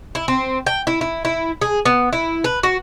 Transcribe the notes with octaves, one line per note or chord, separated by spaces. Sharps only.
E4
C4
G5
E4
E4
E4
G#4
B3
E4
B4
F#4